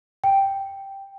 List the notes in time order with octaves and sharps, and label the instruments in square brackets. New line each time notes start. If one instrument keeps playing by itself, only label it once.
[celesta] G5